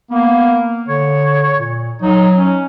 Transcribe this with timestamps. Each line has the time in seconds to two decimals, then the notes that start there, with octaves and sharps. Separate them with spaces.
0.11 A#3 B3
0.88 D3 C#5
1.59 A#2
2.02 F#3 D#4
2.35 C#4